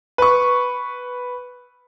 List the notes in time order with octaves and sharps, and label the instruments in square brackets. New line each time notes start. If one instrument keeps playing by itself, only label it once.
[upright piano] B4 C#6